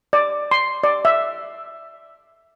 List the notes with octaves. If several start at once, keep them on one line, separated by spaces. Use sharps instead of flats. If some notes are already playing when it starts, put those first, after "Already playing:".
D5
C6
D5
E5